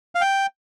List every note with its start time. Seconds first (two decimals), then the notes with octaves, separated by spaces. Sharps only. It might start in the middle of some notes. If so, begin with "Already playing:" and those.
0.15 F5
0.21 G5